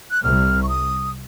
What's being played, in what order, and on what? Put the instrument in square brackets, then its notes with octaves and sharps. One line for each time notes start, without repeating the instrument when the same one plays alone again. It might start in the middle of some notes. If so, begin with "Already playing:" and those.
[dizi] F#6
[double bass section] C2 C3 [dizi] F6
[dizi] C#6
D#6